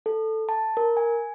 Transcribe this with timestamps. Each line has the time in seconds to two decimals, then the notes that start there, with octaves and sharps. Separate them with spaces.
0.06 A4
0.49 A5
0.77 A#4
0.97 G#5